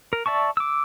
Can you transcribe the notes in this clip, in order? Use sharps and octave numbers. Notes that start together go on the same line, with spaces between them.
A#4
D5 E5 A5 C#6
D6 E6